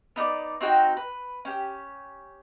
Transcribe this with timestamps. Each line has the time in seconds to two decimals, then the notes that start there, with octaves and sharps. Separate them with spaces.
0.16 B3 D#4 A#4 D5
0.61 C4 D#4 F#4 G5
0.97 B4
1.45 C#4 G4